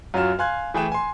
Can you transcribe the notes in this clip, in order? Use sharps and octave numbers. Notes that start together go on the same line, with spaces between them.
F#2 F#3 F4 F#4 F6 E7
F5 G#5 C6 F#6 G#6
E3 A3 G#4 B4 G5 E7
G#5 C6